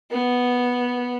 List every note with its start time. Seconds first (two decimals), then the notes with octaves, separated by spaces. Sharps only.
0.11 B3